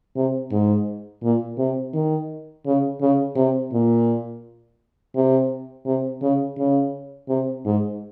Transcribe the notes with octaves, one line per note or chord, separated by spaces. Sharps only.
C3
G#2
A#2
C3
D#3
C#3
C#3
C3
A#2
C3
C3
C#3
C#3
C3
G#2